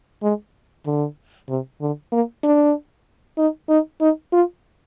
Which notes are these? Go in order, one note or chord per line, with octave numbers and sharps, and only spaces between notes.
G#3
D3
C3
D3
A#3
D4
D#4
D#4
D#4
F4